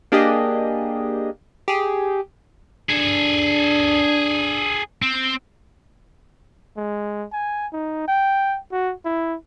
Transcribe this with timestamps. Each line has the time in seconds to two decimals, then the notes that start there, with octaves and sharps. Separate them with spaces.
0.12 A#3 D4 G4 G#4 D#5
1.68 G4 G#4
2.90 D4 G#4 A4
5.02 C4
6.77 G#3
7.32 G#5
7.73 D#4
8.08 G5
8.72 F#4
9.05 E4